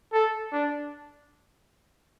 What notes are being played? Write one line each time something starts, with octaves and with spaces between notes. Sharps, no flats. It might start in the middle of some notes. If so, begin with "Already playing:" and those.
A4
D4